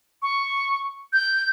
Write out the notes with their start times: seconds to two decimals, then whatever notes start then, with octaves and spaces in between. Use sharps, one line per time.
0.22 C#6
1.13 G6